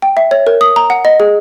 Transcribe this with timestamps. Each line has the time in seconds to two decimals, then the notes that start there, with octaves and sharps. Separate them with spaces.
0.02 G5
0.17 E5
0.31 C#5
0.47 A#4
0.61 D#6
0.76 A#5
0.90 F#5
1.05 D#5
1.20 G#4